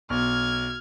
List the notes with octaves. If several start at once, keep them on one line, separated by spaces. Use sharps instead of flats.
B1 F6 G#6